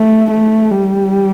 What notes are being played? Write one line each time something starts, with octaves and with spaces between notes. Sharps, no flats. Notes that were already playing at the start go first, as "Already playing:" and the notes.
Already playing: A3
A3
G3